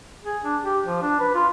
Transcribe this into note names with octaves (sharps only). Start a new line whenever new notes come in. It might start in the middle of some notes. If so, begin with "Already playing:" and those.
G#4
D4
G4
F3
D4
B4
F4